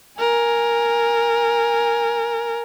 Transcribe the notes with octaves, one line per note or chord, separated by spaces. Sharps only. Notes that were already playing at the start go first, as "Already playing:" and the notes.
A#4 G#5